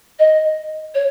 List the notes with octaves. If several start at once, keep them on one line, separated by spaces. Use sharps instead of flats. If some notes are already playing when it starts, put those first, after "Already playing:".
D#5
C#5